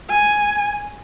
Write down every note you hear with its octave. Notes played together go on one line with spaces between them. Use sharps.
G#5